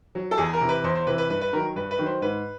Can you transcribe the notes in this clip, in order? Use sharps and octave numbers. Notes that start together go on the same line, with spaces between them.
F#3
A4
E2 G#4
A#4
C3 E3
B4
E2 C5
C5
C3 E3 B4
B4
G2 B4
B4
D#3 F#3 A#4
G2 B4
B4
D#3 F#3
C5
G#2 B4